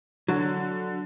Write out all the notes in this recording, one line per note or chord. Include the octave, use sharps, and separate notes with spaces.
D3 F#3